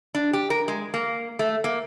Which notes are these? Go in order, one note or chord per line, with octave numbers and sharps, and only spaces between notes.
D4
G4
A#4
G#3
A#3
A3
A#3